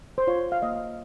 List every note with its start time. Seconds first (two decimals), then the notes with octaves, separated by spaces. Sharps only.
0.18 C5
0.27 F4 C#5
0.52 F5
0.62 A#3 D#5